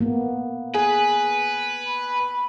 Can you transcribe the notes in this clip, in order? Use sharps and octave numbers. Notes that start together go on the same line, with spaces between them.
A#3 B3
G#4 B4
B5